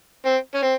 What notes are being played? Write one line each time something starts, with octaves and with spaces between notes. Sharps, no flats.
C4
C#4
C4